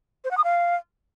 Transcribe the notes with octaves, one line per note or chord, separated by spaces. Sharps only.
C5
F#5
D#6
F5